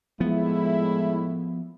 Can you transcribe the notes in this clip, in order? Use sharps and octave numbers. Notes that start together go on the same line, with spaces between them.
A2 F3 G#3 B3 E4